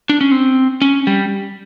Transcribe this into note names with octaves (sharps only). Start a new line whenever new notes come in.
D4
C#4
C4
C#4
G3